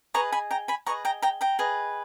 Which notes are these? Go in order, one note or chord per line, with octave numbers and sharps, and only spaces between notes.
G#4 B4 D#5 A#5 C#6
G#5 B5
G5 A#5
G#5 B5
G#4 B4 D#5 A#5 C#6
G5 A#5
G5 A#5
G5 A#5
G#4 B4 D#5